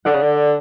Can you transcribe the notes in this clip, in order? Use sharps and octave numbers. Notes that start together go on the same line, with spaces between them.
D3 D5 F#5
C#3
D3